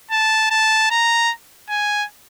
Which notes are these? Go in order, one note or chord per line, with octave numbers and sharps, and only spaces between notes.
A5
A5
A#5
G#5